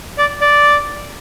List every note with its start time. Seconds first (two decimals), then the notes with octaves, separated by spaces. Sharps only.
0.18 D5
0.41 D5